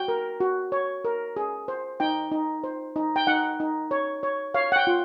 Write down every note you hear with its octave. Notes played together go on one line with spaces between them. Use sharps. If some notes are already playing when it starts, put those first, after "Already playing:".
Already playing: F#4 G5
A#4
F#4
C#5
A#4
G#4
C5
D#4 G5
D#4
C5
D#4
G5
D#4 F#5
D#4
C#5
C#5
C#5 F5
F#5
G5
F4